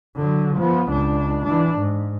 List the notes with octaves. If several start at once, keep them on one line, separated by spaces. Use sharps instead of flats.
D3 F#3
F3 B3
C#2 D4
E3 D4
G#2